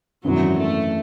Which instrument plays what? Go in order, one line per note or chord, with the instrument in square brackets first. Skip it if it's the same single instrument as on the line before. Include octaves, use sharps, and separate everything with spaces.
[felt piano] G#1 F#2 E3 [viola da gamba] F#3
[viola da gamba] A3